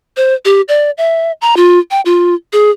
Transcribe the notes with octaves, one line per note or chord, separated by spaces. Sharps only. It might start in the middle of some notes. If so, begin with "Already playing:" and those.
C5
G4
D5
E5
A#5
F4
G5
F4
G#4